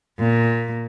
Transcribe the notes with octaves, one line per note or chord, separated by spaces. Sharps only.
A#2